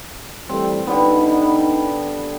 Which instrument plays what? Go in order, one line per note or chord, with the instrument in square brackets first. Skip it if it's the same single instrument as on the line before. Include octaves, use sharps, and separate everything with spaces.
[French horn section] E3 G3 A3 [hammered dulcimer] C4
[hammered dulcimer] D3 G3 B3 [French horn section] D#4